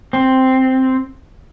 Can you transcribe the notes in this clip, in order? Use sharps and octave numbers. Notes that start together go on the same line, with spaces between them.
C4